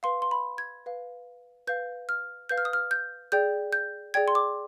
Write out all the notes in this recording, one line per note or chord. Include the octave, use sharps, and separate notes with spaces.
B4 F5 C6
C6
B5
G#6
B4 F5
B4 F5 G6
F6
B4 F5 G6
F6
D#6
F6
G6
G#4 D5 G5 G6
G6
G#4 D5 G5 G#6
C6
D6